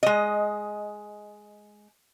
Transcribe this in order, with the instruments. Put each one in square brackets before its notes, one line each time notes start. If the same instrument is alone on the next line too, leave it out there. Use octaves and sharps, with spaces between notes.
[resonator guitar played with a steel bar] G#3 D#5